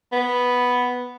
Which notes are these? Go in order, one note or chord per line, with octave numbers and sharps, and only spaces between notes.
B3